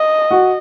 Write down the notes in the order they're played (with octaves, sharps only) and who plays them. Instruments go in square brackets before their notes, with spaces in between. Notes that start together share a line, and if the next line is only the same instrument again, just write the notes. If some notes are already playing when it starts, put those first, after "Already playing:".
Already playing: [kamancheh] D#5
[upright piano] F#4